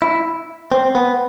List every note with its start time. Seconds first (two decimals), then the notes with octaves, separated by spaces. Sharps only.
0.02 E4
0.72 C4
0.95 B3